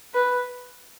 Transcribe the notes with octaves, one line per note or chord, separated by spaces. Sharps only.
B4